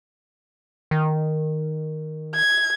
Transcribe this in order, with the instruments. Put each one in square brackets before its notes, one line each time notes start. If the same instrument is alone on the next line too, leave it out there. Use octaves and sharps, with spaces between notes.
[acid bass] D#3
[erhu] G#6